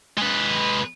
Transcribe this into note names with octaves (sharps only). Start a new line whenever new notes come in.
G#3 B4